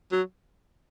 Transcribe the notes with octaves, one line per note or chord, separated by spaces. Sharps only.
F#3